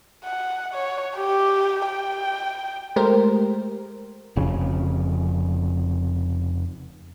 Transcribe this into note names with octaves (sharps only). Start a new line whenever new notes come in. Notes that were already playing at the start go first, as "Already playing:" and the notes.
F#5
C#5
G4
G5
G#3 A3 G4 A#4 C5
F1 F2 C#3